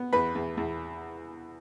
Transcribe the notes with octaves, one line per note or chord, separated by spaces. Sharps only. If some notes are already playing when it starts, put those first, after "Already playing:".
Already playing: B3
E2 B4
E2
E2